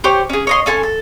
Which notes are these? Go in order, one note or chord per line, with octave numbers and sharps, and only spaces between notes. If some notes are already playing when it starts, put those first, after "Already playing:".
G4 C5 C#5
C#4 G#4
C#5 D#5 C6
C#4 A4 G#5 C6
A4